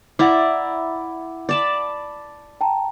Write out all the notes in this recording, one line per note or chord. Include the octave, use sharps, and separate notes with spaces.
E4 D5 E5 F#5 A#5 D6
D5 A5 B5
G5 A5 A#5